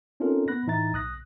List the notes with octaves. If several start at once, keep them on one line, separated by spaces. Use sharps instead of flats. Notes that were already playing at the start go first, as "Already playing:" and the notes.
C4 C#4 D#4 F4 A4 A#4
B3 B5 F#6 A#6
A2 E3 D#4 E5 A#5 A6
B1 D#6 F#6 A#6